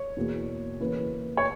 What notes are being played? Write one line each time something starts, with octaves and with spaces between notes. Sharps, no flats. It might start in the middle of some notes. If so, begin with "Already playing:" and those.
Already playing: C#5
E2 B2 A#3
C#3 E3 A#3 B4
C#5